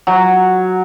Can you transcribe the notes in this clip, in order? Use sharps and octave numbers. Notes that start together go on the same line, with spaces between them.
F#3